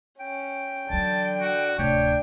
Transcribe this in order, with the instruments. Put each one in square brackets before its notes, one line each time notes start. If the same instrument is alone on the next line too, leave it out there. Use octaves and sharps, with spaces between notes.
[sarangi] C#4 [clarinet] G5
[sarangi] D3 [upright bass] E3 F#3 [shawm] A5
[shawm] F#4
[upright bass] D1 C3 [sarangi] D4 [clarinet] C#5 [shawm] G5